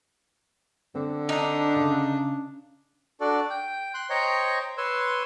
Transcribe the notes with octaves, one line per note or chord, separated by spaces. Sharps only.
D3 C4
D4 D#4
C#3
D4 F#4 A4 D5
G5
C6 F#6
C5 C#5 D#5 G5 A#5 C#6
B4 C#5 C6 E6